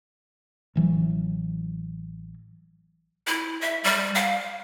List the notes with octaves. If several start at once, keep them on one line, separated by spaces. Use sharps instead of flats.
A1 E3 F#3
E4
E5
G3
F5